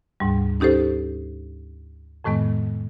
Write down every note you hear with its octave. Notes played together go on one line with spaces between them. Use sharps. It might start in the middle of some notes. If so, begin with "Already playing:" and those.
D2 G#2 G3
C#4 D#4 G4 A4 C5
F2 A2 D#3 G#3 B3